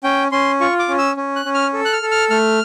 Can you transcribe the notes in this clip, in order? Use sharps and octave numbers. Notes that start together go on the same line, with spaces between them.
C#4 G5
C#4 C6
F4 C#6
D6
C#4
E6
C#4
F#6
C#4
F6
A4
F#6
F6
A4
F6
A3 F6